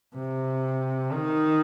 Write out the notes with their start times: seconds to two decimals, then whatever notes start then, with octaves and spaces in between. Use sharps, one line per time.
0.15 C3
1.12 D#3